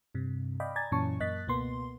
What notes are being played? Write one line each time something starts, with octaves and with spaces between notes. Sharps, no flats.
G2 C3
D5 D#5 F5 G5 B5
D5 G#5 A#5 G#6 A6
F#2 A#2 E3 C#4 A5 C#6
F#2 A#3 D#5 F#6 A6 B6
C#2 B2 A#3 B3 C6